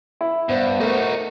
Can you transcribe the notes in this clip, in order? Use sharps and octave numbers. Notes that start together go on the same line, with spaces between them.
E4
G2 B3 C5
A3 D#4 F#4 A#4